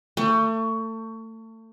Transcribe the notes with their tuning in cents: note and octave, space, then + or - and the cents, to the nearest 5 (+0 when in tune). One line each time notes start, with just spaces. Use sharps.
A3 +30